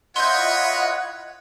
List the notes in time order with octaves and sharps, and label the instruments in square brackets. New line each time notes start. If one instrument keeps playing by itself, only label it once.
[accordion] E4 F4 D#5 [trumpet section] B4 C#5 [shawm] F#5 [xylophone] C6 G6